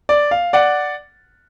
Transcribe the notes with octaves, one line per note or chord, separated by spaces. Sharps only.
D5
F5
D5 F#5